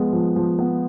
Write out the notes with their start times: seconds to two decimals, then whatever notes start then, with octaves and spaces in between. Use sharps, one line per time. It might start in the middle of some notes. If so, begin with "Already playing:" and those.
Already playing: F3 G#3 B3
0.13 F3
0.36 F3
0.59 B3